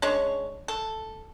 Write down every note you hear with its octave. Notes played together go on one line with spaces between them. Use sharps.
G#3 C#4 D4 C#5
A4